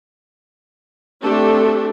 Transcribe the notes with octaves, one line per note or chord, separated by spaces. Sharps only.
A3 C4 D4 G4 A4